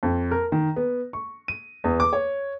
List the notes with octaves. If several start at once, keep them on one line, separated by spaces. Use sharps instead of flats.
F2
A#4
D#3
B3
C#6
D#7
E2
D6
C#5